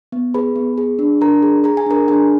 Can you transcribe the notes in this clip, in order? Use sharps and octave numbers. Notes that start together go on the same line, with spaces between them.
B3
G#4 B4 B5
B3
G#4
D4
D4 A#4 A#5
G#4
G#4 A#5
G#5
D4 A#4 A#5
D4 G#4 G#5